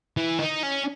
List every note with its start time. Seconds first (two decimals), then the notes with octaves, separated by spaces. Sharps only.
0.17 E3
0.39 D#4
0.63 C#4